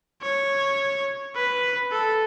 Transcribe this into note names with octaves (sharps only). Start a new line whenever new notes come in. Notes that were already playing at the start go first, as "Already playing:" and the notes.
C#5
B4
A4